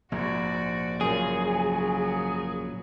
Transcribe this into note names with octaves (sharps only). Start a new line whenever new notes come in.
A#1 G#2 F#4 D5
F#2 A#2 C#3 F#3 G#4